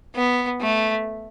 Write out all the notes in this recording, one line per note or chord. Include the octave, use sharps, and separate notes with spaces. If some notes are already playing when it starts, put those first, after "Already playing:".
B3
A3